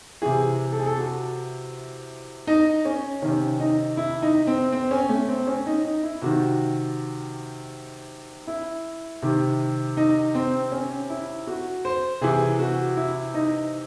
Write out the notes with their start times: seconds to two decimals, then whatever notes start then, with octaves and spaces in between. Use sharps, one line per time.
0.22 C3 E3 G#4
0.72 A4
0.79 G#4
0.86 A4
0.97 F#4
2.47 D#4
2.85 C#4
3.22 C3 D#3 C#4
3.60 D#4
3.97 E4
4.22 D#4
4.47 C4
4.73 C4
4.91 C#4
5.09 A3
5.28 C4
5.47 C#4
5.66 D#4
5.84 D#4
6.03 E4
6.21 C3 D#3 F#4
8.47 E4
9.22 C3 D#3
9.97 D#4
10.35 C4
10.72 C#4
11.10 E4
11.47 F#4
11.85 C5
12.21 C3 E3 G#4
12.59 F#4
12.97 E4
13.34 D#4